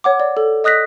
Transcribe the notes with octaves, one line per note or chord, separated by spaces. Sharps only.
C#5 F#5 D6
D5
A4
D#5 D#6 F#6 A#6 B6